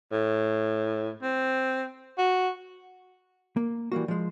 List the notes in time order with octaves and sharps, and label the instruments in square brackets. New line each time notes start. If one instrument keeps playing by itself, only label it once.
[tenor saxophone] A2
C4
F#4
[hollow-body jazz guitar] A#3
E3 G3 A#3 F#4
F3 G#3